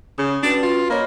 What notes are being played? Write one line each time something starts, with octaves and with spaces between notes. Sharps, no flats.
C#3 D#6
C#4 D4 F#4 B4
F4
A#3 C#5 D#5 B5